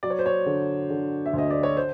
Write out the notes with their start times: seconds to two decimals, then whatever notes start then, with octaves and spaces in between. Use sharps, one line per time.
0.03 F#3 D5
0.10 C#5
0.19 C5
0.26 C#5
0.46 D3
0.90 D3
1.26 E5
1.33 D2 D#5
1.50 D5
1.63 C#5
1.77 C5